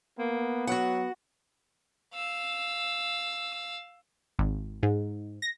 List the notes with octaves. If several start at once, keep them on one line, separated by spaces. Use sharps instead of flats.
A#3 B3
F#3 F#4 F#5
F5 E6
G#1
G#2
A#6